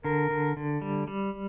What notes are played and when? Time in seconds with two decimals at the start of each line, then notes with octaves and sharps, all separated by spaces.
0.04 D3 A#4
0.30 D3
0.57 D3
0.82 G3
1.08 G3